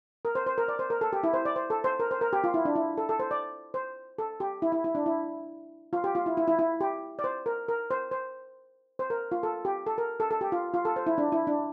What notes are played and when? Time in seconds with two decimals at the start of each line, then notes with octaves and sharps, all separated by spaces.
0.25 A#4
0.35 C5
0.47 C5
0.58 A#4
0.68 D5
0.79 C5
0.90 A#4
1.01 A4
1.13 G4
1.23 E4
1.34 C5
1.45 D5
1.56 C5
1.70 A4
1.84 C5
2.00 A#4
2.11 C5
2.21 A#4
2.33 G4
2.44 F4
2.54 E4
2.65 D4
2.76 E4
2.98 A4
3.09 A4
3.20 C5
3.31 D5
3.74 C5
4.18 A4
4.40 G4
4.62 E4
4.72 E4
4.84 E4
4.95 D4
5.06 E4
5.93 F4
6.04 G4
6.15 F4
6.26 E4
6.37 E4
6.48 E4
6.59 E4
6.81 G4
7.19 D5
7.24 C5
7.46 A#4
7.68 A#4
7.91 C5
8.11 C5
8.99 C5
9.10 A#4
9.32 F4
9.43 A4
9.65 G4
9.87 A4
9.98 A#4
10.20 A4
10.31 A4
10.41 G4
10.52 F4
10.74 F4
10.85 A4
10.96 C5
11.07 E4
11.18 D4
11.32 E4
11.47 D4